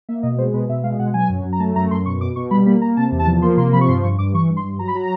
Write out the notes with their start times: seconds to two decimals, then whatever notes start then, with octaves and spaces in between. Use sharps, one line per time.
0.09 A#3 E5
0.23 B2 D#5
0.38 G#3 C5
0.54 B2 B4
0.69 B2 E5
0.84 G#3 F5
0.99 B2 F#5
1.14 F#3 G#5
1.29 F#2
1.45 F#2
1.53 A#5
1.60 A3 A5
1.76 F#2 A#5
1.91 F#2 C6
2.06 B2 C#6
2.21 B2 D6
2.36 B2 C#6
2.51 G3 B5
2.66 A#3 B5
2.81 A#3 A#5
2.97 C3 A5
3.12 E2
3.19 A5
3.27 F3
3.42 A#3 C6
3.57 C3 C6
3.73 F3 B5
3.81 C#6
3.88 G2 C6
4.03 G2 C#6
4.19 G2 D6
4.34 E3 C#6
4.50 G2
4.57 C6
4.64 G2
4.79 F#3 A#5
4.88 B5
4.95 F#3 A#5